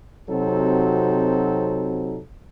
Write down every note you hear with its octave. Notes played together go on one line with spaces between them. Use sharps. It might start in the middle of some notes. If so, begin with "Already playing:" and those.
C3 F#3 C4 D#4 F#4 A4